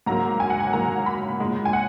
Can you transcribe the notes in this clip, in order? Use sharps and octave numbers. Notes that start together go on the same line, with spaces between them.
G#2 F#3 A#3 A#5
G#5
F#5
G#5
G#2 F#3 A#3 A#5
B5
A#2 G#3
G#5
F#5